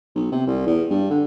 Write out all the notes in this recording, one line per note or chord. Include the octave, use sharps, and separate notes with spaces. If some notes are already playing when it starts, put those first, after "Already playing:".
B1
C3
C2
E2
G2
D3